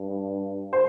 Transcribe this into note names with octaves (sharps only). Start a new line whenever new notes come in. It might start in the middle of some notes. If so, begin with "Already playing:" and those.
Already playing: G2
C5